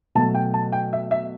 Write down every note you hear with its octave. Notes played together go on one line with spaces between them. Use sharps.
B2 F#3 A3 A5
G5
A5
G5
E5
E5